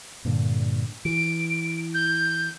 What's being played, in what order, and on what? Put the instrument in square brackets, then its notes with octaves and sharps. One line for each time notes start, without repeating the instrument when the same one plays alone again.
[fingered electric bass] G2 A#2 D3
[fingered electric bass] E3 [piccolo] D7
[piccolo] G6